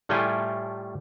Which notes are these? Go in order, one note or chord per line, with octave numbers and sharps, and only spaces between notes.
A2 G3 A3 E4 F4 G#5